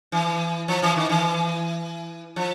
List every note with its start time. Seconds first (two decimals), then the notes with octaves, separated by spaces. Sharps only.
0.12 E3
0.68 F3
0.82 E3
0.96 D#3
1.09 E3
2.36 F3